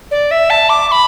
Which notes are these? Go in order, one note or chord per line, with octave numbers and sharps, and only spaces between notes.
D5
E5
A5
D6
D6
B5